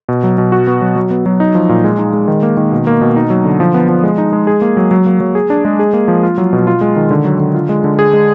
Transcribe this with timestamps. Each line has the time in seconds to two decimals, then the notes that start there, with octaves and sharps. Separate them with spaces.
0.09 B2
0.23 F#3
0.38 B2
0.52 F#4
0.67 B3
0.82 F#3
0.96 F#3
1.11 B3
1.26 F#3
1.40 D#4
1.55 F3
1.69 A#2
1.84 G#3
1.98 D#4
2.13 G#3
2.28 D#3
2.43 A#3
2.57 D#3
2.72 B2
2.87 A#3
3.01 B2
3.16 D#4
3.30 F#3
3.45 D3
3.60 F3
3.74 B3
3.89 F3
4.04 G#3
4.18 D#4
4.33 G#3
4.47 G#4
4.62 A#3
4.77 F#3
4.91 F#3
5.06 A#3
5.20 F#3
5.35 G#4
5.50 D4
5.65 G#3
5.79 G#4
5.93 A#3
6.08 F3
6.23 F4
6.38 F#3
6.53 B2
6.67 F4
6.81 G#3
6.96 D#3
7.11 D3
7.25 F#3
7.40 D3
7.55 F4
7.69 G#3
7.84 D3
7.99 G#4
8.13 G#3